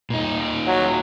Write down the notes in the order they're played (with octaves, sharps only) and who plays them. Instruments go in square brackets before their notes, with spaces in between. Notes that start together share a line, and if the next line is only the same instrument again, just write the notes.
[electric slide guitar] A#2 D#4
[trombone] F#3